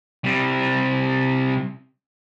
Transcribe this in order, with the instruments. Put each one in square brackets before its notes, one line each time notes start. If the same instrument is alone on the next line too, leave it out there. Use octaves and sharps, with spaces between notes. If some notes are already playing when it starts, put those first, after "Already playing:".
[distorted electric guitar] C3 G3